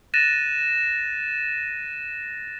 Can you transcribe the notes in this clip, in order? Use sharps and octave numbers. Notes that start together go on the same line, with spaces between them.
F#6 A6 A#6 D#7 E7